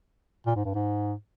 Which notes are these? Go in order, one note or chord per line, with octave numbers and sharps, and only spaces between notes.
A#2
G#2
G2
G#2